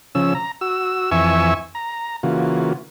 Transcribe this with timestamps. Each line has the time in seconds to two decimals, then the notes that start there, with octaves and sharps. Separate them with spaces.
0.15 C#3 F3 C#4 E6
0.35 A#5
0.61 F#4 E6
1.11 F2 E3 E5 G#5 C#6 E6
1.75 A#5
2.23 C#3 E3 A#3 F4 F#4